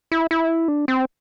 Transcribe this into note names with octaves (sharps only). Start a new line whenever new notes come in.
E4
E4
D4
C4